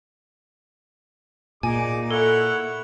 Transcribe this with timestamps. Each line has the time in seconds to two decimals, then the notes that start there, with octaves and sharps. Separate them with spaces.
1.63 A#2 D#4 G#4 G#5 D6
2.11 E4 A4 C#5 F#5